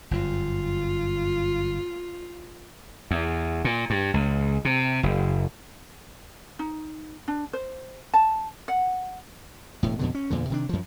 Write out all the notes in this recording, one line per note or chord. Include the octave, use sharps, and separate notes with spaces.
G1 F#2 F4
E2
A#2
G2
C#2
C3
F#1
D#4
D4
C5
A5
F#5
E1 A2
F2 B2 D3
C#4
E2 A#2 D3
C3 D#3 D4
F#2 F3